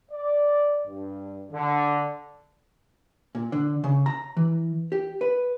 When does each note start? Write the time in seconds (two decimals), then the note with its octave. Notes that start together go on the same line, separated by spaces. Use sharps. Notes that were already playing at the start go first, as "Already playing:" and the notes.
0.11 D5
0.87 G2
1.52 D3
3.35 A#2
3.52 D3
3.84 C#3
4.06 A#5
4.37 E3
4.92 G4
5.21 B4